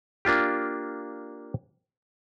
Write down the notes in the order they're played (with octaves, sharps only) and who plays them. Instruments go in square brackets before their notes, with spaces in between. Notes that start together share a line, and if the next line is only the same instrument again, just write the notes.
[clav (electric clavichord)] A#3 D4 F4 G4